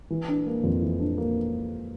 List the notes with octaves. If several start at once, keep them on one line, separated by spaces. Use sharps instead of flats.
E3
D4
A#3
F2
E3
D4
A#3